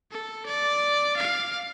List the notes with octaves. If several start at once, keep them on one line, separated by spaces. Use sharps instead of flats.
A4
D5
F5